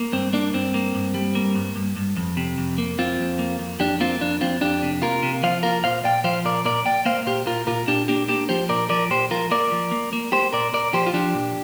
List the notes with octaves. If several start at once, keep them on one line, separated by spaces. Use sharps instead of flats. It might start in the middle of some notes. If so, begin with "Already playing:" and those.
Already playing: A#3
G2 C4
A#3 D4
G2 C4
A#3
G2
G3
A#3
G2
G2
G2
F2
C3
F2
A#3
F2 C4 F4
F2
A#3
F2
F2 D4 G4
A#3 C4 F4
F2 D4
F2 C4 F4
F2 D4 G4
C3
A#3 F4 A#4
C3
F3 C5 F5
A#3 F4 A#4
A#2 C5 F5
A#2 D5 G5
F3 C5 F5
A#2 A#4 D5
A#2 A#4 D5
A#2 D5 G5
A#3 C5 F5
A#2 G4 C5
A#2 F4 A#4
A#2 F4 A#4
A#2 D4 G4
A#3 D4 G4
A#3 D4 G4
F3 G4 C5
A#2 A#4 D5
F3 A#4 D5
A#2 G4 C5
F3 F4 A#4
A#3 A#4 D5
F3
A#3
A#3
A#3 G4 C5
A#2 A#4 D5
A#2 A#4 D5
F3 G4 C5
F4
F3 D4 G4
A#2